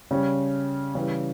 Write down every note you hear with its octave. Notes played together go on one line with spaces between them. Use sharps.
C#3 G3 C#4
C#3 E3 G3